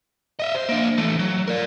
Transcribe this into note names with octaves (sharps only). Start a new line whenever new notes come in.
D#5 E5
C5
A#3 D4
E3 A3
F#3
A#4 D5